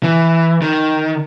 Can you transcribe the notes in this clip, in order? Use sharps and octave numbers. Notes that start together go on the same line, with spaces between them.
E3
D#3